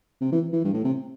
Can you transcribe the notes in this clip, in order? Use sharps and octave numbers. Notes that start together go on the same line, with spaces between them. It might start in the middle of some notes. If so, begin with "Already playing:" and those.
C3
E3
E3
G2
A2
C3